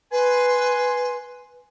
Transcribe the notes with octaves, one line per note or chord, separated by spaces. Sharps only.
B4 G#5 C6